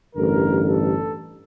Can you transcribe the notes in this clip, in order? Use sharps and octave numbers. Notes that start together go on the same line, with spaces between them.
A1 G2 D3 A#4
A4